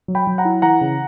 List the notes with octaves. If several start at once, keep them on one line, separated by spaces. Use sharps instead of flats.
F#3
G5 B5
F#3
F#5 A#5
E4
E3 F#5 A#5
C#3